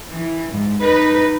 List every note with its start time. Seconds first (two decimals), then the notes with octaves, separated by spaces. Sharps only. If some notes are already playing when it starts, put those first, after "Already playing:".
0.12 E3
0.52 G#2
0.81 D#4 B4